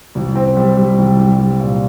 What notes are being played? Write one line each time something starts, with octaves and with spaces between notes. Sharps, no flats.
C2
C4
G3
G3
C2
G3
G3
A#2